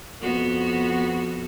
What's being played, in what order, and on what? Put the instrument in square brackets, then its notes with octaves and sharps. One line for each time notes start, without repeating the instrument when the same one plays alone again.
[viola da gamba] F2 B3 F#4